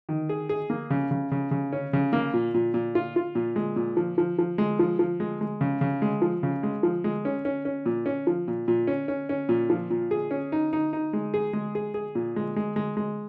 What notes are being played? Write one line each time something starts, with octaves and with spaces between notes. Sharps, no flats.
D#3
G#4
G#4
A#3
C#3
C#3
C#3
C#3
C#4
C#3
A#3
A#2
A#2
A#2
F4
F4
A#2
G#3
A#2
F3
F3
F3
G#3
F3
F3
G#3
G#3
C#3
C#3
G#3
F3
C#3
G#3
F3
G#3
C#4
C#4
C#4
A#2
C#4
F3
A#2
A#2
C#4
C#4
C#4
A#2
F3
A#2
G#4
C#4
D#4
D#4
D#4
G#3
G#4
G#3
G#4
G#4
A#2
G#3
G#3
G#3
G#3